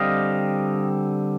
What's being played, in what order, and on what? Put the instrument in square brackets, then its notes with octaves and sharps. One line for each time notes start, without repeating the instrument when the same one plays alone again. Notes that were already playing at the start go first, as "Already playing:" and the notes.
Already playing: [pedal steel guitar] D3 G3 C4 D#5 F5